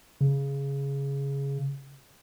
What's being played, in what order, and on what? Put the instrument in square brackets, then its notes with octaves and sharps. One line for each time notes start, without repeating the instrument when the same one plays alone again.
[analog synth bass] C#3